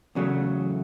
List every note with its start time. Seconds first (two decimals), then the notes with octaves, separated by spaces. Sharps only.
0.15 E2 C#3 F#3 A3